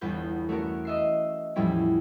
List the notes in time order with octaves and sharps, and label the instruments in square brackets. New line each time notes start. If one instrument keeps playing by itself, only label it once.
[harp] G1 E2 B4 G6
A3 C#4 F#4 A#4
D#5 E5 C7
E2 A2 F3 G3 C#4 E4